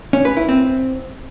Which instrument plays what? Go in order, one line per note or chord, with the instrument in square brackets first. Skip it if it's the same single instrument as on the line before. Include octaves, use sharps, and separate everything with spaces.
[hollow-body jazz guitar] C#4
B4
E4
C4